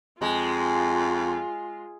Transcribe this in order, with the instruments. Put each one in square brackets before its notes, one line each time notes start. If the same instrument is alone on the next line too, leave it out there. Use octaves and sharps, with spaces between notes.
[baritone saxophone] F2 [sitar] G#3 [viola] F4